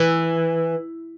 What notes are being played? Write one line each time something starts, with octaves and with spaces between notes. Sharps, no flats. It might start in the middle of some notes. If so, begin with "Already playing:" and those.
Already playing: E3